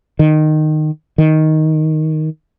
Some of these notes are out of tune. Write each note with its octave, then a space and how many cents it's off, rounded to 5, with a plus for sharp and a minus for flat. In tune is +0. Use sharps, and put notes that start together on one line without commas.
D#3 -15
D#3 +5